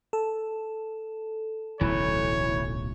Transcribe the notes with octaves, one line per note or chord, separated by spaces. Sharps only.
A4
D1 B1 E3 A3 C#5